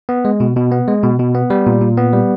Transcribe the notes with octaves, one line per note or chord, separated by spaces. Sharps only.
B3
G#3
B2
B2
B3
G#3
B2
B2
B3
G3
A#2
A#2
B3
G3